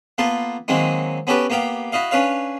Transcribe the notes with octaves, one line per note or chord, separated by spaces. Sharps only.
A#3 B3 F4 A4
D#3 F#3 G#3 A#3 C4 D#4
B3 C#4 F#4 G4 A4 B4
A#3 B3 G4 F5 G5
E4 F#4 D#5 F5
C#4 D4 B4 C#5 F5